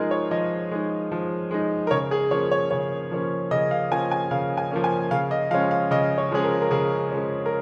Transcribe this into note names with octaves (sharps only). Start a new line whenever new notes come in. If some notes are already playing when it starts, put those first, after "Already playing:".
Already playing: F3 G#3 D#4 F4 G#4 A#4
C#5
F3 D#5
G#3 D#4
F3
G#3 D#4
A#4
C#3 C#5
G#4
F3 A#3 C#4 C#5
C#5
C#3 C#5
F3 A#3 C#4
C#3 D#5
F5
F3 A#3 C#4 G#5
G#5
C#3 F5
G#5
F3 A#3 C#4
G#5
C#3 F5
D#5
F3 G#3 C#4 F5
F5
C#3 D#5
C#5
F3 G#3 C#4 G#4
A#4
A#4
C#3 G#4
F3 G#3 C#4
A#4